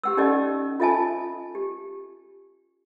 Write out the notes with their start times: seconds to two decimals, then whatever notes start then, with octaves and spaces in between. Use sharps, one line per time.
0.04 G4 F#5 E6
0.17 C#4 D#4 G4 A4 D5 D#5
0.80 F4 A4 D#5 E5 G#5 A5
1.55 G4